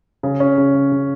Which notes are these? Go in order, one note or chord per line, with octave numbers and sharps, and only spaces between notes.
C#3
C#4
C#3
C#3
C#3